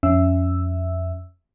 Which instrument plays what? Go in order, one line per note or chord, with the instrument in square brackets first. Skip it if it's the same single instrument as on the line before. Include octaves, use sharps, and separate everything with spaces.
[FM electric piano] F2 C#4 E5 E6